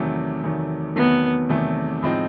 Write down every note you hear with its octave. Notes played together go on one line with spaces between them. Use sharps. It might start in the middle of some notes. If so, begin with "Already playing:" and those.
Already playing: E2 C3 D#3 F#3 A3
E2 C3 D#3 F#3 A3
E2 C3 D#3 F#3 A3 B3
E2 C3 D#3 F#3 A3
A2 F3 G#3 C4 D#4